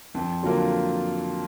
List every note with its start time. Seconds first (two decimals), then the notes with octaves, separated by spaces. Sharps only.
0.15 F2
0.43 D3 F#3 A#3 F4